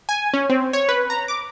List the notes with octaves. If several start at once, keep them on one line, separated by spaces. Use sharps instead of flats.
G#5
C#4
C4
C#5
B4
A#5
D6